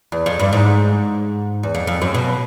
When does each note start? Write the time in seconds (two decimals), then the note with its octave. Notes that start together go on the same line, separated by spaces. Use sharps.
0.12 E2
0.26 F2
0.40 G2
0.53 G#2
1.63 E2
1.75 F2
1.87 F2
2.02 F#2
2.15 B2